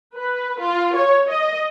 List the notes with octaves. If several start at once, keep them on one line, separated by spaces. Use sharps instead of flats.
B4
F4
C#5
D#5